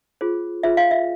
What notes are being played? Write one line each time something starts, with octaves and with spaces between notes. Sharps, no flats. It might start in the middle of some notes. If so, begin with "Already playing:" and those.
F4 G#4 C5
F4 G#4 C5 E5
F5
E5